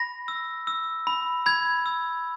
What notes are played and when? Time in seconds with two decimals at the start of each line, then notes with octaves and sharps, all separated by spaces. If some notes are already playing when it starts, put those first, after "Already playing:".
Already playing: B5 A#6
0.28 E6
0.67 E6
1.07 B5
1.46 B5 G#6
1.86 E6